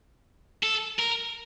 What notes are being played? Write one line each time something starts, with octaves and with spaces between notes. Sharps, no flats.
A4
A#4